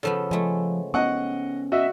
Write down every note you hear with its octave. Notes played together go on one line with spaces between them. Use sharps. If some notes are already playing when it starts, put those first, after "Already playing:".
C#3 F3 B3 A4
F3 G#3 A3
B3 C#4 D#5 F#5 C#6
F#4 D#5 E5